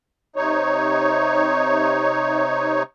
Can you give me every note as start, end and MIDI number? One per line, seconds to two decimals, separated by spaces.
0.36 2.83 48
0.36 2.83 63
0.36 2.83 73